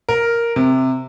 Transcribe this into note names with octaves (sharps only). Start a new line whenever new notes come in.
A#4
C3